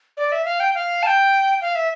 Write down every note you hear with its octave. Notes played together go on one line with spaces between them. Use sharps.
D5
E5
F5
G5
F5
A5
G5
F5
E5